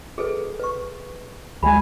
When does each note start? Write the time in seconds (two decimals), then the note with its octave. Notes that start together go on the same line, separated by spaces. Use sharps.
0.18 G#4 A4 B4
0.59 B4 C#6
1.63 D2 G#3 G#5 B5